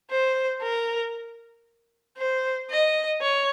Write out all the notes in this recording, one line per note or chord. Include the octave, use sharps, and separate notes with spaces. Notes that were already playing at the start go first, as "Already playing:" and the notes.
C5
A#4
C5
D#5
C#5